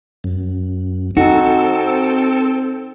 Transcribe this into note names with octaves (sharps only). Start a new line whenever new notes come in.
F#2
C4 D#4 F#4 A4